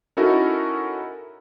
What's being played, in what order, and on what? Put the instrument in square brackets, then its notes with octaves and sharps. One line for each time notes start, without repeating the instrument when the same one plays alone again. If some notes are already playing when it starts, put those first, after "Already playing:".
[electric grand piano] C#4 D#4 E4 F#4 A4 A#4